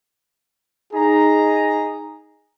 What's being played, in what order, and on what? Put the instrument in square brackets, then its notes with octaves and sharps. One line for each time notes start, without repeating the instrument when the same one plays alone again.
[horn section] D#4 G#4 A#5